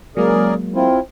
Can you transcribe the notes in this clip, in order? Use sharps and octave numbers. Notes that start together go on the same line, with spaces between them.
C#3 F#3 G#3 A#3 G#4 A#4 D5
C4 E4 F4